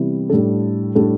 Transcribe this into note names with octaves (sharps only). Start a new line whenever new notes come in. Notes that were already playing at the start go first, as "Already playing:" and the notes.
Already playing: C3 E3 G3 B3 E4
A2 G3 D4 A4
A2 G3 D4 A4